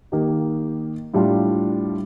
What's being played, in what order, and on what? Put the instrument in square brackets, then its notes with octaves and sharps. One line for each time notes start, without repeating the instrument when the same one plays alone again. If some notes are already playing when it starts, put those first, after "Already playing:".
[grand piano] D#3 A#3 D#4 G4
A2 G3 D4 F4